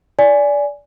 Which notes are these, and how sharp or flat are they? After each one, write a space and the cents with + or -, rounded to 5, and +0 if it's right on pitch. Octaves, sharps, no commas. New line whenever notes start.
D5 -20 G#5 +0